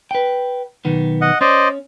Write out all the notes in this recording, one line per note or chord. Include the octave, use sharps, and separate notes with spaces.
B4 G5
B1 D#3 B3
D#5 F#5
C#4 C5 D5 D#5